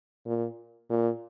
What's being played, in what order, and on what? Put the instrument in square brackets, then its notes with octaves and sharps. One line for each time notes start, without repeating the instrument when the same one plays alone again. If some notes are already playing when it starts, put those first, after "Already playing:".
[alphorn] A#2
A#2